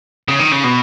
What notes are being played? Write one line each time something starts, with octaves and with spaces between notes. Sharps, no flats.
C#3
D#3
C#3
B2